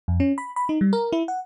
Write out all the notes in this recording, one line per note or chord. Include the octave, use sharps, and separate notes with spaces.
F2
C#4
B5
B5
D#4
G3
A#4
E4
F#5